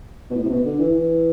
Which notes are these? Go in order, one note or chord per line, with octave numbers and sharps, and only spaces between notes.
B2
A2
C3
B2
D3
E3
E3